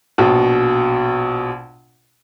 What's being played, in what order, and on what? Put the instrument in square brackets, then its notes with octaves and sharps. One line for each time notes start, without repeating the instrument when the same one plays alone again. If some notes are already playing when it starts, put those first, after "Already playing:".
[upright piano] A#1 B2